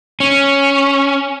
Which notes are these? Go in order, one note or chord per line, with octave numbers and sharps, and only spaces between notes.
C#4